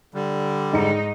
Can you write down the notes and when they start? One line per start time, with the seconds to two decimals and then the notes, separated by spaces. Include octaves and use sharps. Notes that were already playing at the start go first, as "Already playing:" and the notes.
0.14 D3 G3
0.73 G#2 D#4 A#5 C#7